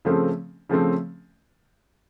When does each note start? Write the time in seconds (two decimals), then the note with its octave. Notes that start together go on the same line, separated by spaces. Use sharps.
0.05 C#3 F3 A3 C4
0.69 C#3 F3 A3 C4